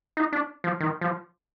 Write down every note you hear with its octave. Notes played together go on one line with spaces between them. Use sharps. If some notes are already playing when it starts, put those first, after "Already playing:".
D#4
D4
F3
D#3
F3